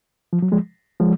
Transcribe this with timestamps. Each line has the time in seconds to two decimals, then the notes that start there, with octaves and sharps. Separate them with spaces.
0.33 F3
0.42 F#3
0.52 F3 G#3
1.00 F3 G#3